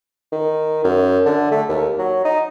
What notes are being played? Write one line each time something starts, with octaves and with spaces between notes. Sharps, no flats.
D#3
F#2
D3
A3
D#2
F#3
D#4